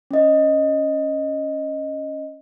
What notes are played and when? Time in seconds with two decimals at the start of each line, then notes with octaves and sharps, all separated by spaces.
0.11 C#4 D#5